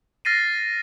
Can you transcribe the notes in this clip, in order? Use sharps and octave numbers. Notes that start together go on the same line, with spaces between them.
F6 A6 A#6 C7 D#7